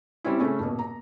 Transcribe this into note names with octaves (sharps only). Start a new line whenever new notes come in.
G3 C4 C#4 E4
C#3 A3 C#4
D#1 B2
A#5